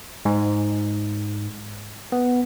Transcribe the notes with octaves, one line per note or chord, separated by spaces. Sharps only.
G#2
B3